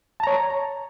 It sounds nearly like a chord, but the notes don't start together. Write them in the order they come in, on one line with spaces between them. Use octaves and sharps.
A5 A#5 C#5